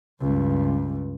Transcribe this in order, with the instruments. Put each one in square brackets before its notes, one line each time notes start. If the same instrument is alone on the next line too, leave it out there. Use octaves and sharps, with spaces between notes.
[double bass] C#2 G2